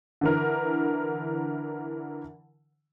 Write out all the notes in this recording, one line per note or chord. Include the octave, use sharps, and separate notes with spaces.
D3 E3 A#4